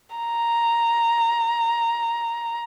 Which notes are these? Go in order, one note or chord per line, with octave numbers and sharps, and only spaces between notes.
A#5